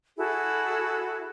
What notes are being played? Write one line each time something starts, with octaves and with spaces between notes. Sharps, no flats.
E4 F#4 G#4 A4